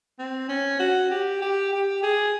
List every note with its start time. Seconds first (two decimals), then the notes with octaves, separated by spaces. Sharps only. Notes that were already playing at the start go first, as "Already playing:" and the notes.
0.19 C4
0.49 C#4
0.80 F#4
1.11 G4
1.42 G4
1.72 G4
2.03 G#4